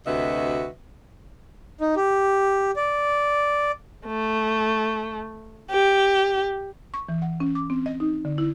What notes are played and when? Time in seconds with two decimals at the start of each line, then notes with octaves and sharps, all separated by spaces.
0.06 D2 C3 F#4 B4 D#5 E5
1.81 D#4
1.96 G4
2.76 D5
4.06 A3
5.71 G4
6.94 C#6
7.09 E3
7.22 F#5
7.40 C#4
7.55 D6
7.70 C4
7.86 D#5
8.00 D#4
8.25 D3
8.38 E4